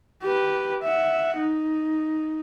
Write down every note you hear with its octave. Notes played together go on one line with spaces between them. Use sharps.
G4 B4
E5 F#5
D#4